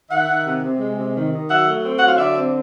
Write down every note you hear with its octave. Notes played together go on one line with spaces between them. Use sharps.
D#3 E5 F#5
D#3
C3
C3
G#3
C3
D#3
D#3
F#3 E5 F#5
A3
C4
F#3 F#5
F5
D3 D5 E5
C4